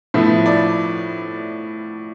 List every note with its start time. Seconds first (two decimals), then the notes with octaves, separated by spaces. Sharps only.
0.14 A2 F3 B3 E5
0.46 D5